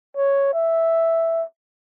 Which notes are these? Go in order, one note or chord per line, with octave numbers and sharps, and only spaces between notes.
C#5
E5